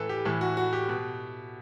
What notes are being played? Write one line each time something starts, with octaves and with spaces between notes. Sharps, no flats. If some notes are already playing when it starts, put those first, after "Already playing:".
Already playing: A2 E3 A4 B4
G4
A2 E3 A4
F#4
F#4
G4
B2